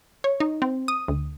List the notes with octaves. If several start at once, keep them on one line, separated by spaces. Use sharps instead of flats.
C#5
D#4
C4
D#6
D2